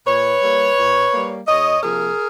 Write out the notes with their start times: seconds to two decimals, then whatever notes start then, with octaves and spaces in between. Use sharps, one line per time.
0.06 A#2 B4 C#5
0.42 G3 A#3
0.77 A#2
1.12 G3 A#3
1.48 E2 C#5 D#5
1.83 C3 F3 A#3 G#4 A#4